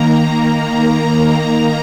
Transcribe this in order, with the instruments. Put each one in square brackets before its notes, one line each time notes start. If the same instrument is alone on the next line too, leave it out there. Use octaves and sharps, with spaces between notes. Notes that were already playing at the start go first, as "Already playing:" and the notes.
Already playing: [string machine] D#3 A#3 A#5
A#5